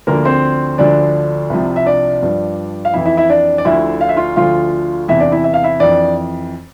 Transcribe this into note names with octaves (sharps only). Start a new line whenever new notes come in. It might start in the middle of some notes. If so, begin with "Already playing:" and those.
D2 D3 F3 A#3 A#4
C4 C5
D2 D3 F3 D4 D5
C2 C3 F3
E5
D4 D5
G2 F3
F5
F2 E3 E4 E5
E4 E5
E4 E5
D4 D5
D5
D2 D3 F3 E4 E5
F5
E5
F4 F5
D2 D3 F3 F4 F5
E2 C3 E3 E4 E5
D4 D5
E4 E5
E5
F5
E4 E5
F2 E3 D4 D5